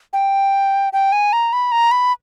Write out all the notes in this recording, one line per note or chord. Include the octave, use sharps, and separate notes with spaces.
G5
G5
G#5
A#5
B5
A#5
B5